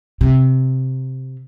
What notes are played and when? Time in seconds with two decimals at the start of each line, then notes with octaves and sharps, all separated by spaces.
0.21 C3